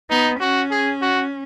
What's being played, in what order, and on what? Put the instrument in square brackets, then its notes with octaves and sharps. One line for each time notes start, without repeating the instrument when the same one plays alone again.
[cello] B3 [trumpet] D#4
[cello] C#4 [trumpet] F#4
[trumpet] G#4
F#4